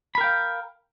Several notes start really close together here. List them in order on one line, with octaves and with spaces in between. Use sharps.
B5 A#4 G5 F5